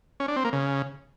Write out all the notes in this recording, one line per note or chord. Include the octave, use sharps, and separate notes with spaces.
C#4
D4
C4
A#3
C#3